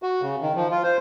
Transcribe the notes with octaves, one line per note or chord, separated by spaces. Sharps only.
F#4
C#3
D#3
F3
F4
C5